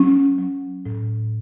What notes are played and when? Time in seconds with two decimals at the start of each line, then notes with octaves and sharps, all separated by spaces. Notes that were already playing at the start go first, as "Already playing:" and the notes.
Already playing: F#3 C#4
0.39 F#3
0.86 A2